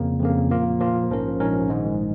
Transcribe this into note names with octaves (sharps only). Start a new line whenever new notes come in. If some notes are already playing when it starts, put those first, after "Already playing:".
Already playing: F2 C#3 A#3
F2 C#3 A#3
A#2 F3 A#3 F4
A#2 F3 A#3 F4
A#1 G#2 F3 C#4 A#4
A#1 G#2 F3 C#4 A#4
A#1 G#2 D#3 G#3